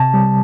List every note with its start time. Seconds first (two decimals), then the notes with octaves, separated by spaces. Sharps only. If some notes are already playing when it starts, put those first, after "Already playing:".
Already playing: C3 A5
0.14 G3